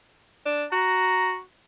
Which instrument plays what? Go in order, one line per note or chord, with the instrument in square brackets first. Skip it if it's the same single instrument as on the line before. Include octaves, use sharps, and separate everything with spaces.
[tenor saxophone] D4
[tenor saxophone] F#4 [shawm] A#5